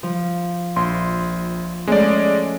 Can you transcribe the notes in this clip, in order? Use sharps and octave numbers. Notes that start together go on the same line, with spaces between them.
F3
A#1 C6
G#3 A3 C#4 D5